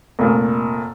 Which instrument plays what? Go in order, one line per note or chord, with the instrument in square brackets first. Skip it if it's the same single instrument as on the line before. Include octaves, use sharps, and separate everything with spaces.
[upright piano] F1 A#2